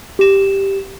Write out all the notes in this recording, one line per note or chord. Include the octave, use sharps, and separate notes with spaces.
G4 E7